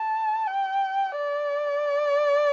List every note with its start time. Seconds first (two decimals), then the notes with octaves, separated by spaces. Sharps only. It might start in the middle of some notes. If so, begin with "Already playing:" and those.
Already playing: A5
0.47 G5
1.17 D5